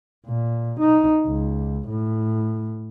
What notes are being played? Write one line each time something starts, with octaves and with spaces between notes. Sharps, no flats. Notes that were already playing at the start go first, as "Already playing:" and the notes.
A#2
D#4
C#2
A2